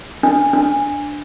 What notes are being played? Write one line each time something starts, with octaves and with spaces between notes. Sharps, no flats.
D4
D4